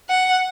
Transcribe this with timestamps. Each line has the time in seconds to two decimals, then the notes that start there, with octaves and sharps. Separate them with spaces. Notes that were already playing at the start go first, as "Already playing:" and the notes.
0.09 F#5